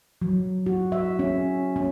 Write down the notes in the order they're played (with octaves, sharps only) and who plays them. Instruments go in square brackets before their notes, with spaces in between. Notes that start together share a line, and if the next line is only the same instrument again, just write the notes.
[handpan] F#3
F#4
E5
C#4
C#4